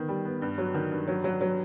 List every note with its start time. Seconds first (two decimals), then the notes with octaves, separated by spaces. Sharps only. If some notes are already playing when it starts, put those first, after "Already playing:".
Already playing: D#3 B3
0.08 G3
0.25 B3
0.42 G2
0.58 F#3
0.74 D#3
0.91 G2
1.07 F#3
1.24 F#3
1.41 F#3